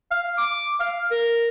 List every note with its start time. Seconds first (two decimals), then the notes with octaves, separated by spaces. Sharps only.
0.11 F5
0.38 D6
0.80 F5
1.11 A#4